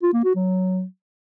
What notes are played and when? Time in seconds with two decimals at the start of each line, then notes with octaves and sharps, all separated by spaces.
0.02 F4
0.13 A#3
0.24 F#4
0.35 F#3